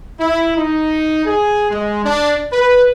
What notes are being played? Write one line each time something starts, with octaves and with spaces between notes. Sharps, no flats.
E4
D#4
G#4
G#3
D4
B4